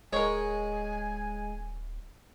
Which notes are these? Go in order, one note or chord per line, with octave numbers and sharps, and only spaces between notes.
D1 G#3 A#4 C#5 G#5